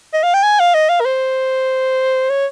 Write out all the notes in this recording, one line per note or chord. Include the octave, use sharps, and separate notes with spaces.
D#5
F5
G5
G#5
F5
D#5
F5
A#4
C5
C#5